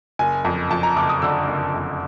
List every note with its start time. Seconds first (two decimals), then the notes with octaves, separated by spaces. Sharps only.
0.19 F#1 G#5
0.45 F2
0.70 F2 A5
0.83 A#5
0.97 F#1 D6
1.09 D#6
1.22 D3 E6
1.48 F#1
1.74 F2